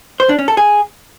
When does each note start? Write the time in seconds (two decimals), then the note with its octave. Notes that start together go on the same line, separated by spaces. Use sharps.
0.20 C5
0.29 D4
0.39 C#4
0.48 A4
0.57 G#4